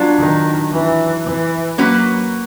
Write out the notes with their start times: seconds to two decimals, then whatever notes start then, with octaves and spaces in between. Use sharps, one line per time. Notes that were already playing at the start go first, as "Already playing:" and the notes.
Already playing: F#3 B3 D4 F4
0.19 D#3
0.72 E3
1.25 E3
1.78 F#3 A#3 C#4 F#4 B4